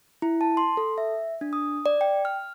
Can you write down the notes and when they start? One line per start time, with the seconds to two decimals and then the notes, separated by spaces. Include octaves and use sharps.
0.22 E4
0.41 A5
0.57 C6
0.77 A4
0.98 E5
1.41 D4
1.53 D#6
1.86 D5
2.01 G5
2.25 F6